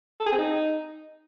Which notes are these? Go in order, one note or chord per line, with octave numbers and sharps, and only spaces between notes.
A4
G#4
C4
D#4